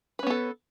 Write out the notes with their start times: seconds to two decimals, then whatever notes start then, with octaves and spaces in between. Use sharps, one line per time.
0.19 B4
0.23 C#4
0.27 B3
0.30 A4